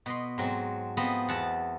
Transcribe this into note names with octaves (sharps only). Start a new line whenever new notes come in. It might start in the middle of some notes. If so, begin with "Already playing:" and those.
B2 D#5 C6
G#2 F#3 C4
F3 B3 C4 D#5
E2 F#5 A5